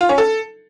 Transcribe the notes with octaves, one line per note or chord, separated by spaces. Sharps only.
F4
C#4
A4